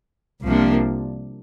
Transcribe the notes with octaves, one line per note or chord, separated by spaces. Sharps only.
C2 C3 F3 A#3 D4